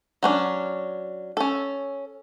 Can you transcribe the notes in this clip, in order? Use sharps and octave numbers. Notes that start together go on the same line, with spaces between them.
F#3 C#4 D4
C#4 A4